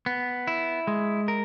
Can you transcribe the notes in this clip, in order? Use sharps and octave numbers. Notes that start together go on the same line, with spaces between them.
B3
E4
G#3
A#4